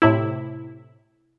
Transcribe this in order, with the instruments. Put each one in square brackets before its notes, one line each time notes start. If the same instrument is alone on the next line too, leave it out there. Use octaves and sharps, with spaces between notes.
[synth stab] A2 C3 E4